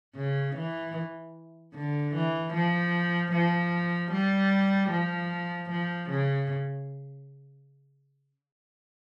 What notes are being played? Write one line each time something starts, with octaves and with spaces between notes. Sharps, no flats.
C#3
E3
D3
E3
F3
F3
G3
F3
F3
C#3